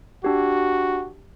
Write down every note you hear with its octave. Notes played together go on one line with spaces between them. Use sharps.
D4 F#4 G4